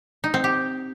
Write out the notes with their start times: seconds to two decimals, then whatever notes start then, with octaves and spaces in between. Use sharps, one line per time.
0.24 D#4
0.34 C4
0.44 G4